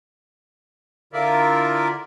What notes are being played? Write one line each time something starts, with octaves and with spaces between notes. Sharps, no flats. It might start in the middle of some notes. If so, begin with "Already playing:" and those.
D3 E4 F4 A#4 D5 E5